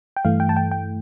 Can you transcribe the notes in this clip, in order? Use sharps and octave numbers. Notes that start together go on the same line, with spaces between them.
G5
G2 E3 A3 F5
G5
A5
G5
G5